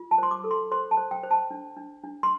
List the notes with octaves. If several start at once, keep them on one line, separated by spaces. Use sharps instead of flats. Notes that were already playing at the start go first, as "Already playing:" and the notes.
Already playing: F4
A5
C5 C6
D6
A4
C6
C5 C6
A5
C5
G5
C5
A5
D4
D4
D4
C6